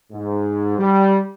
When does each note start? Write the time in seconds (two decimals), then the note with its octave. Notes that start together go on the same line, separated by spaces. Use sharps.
0.12 G#2
0.78 G3